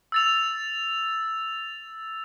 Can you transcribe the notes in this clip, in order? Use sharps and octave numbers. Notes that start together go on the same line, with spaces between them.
E6 A6 F7